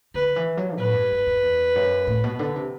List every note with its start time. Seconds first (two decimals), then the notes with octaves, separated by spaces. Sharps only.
0.14 D3 B4
0.36 E3
0.57 F#3
0.78 A2 B4
0.94 G2
1.11 F#2
1.27 F#2
1.43 E2
1.75 F#2
2.07 A2
2.24 B2
2.39 D3
2.56 C3